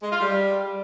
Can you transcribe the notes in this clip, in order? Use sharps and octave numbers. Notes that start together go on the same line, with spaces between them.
G#3
F4
G3